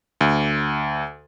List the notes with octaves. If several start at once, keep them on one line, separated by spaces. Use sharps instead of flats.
D2